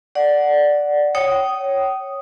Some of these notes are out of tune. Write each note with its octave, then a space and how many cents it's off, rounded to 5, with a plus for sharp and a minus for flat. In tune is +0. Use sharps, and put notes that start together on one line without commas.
D5 +0 F#5 +0
C#5 -5 G5 -35 D#6 +0